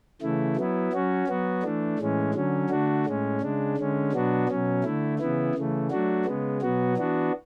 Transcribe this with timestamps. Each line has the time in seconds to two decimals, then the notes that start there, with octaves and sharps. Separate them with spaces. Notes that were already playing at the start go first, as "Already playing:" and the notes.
0.21 C#3 E3 A3 E4
0.57 F#3 B3 E4
0.93 F#3 C#4 F#4
1.27 F#3 B3 F#4
1.63 E3 A3 D4
1.99 A2 E3 G#3 C#4
2.34 D3 F#3 C#4
2.69 D3 A3 D4 F#4
3.06 A2 G#3 C#4
3.41 C#3 G#3 D4
3.77 D3 G#3 C#4
4.12 B2 F#3 B3 D4 F#4
4.48 B2 F#3 C#4
4.83 D3 A3 E4
5.18 C#3 E3 B3 E4
5.55 C#3 E3 A3
5.90 F#3 A3 D4 F#4
6.25 C#3 G#3 B3
6.62 B2 F#3 B3 F#4
6.97 E3 B3 D4 F#4